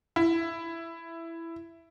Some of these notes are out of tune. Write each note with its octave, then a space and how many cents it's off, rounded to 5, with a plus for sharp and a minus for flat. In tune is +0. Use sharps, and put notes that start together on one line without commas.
E4 +10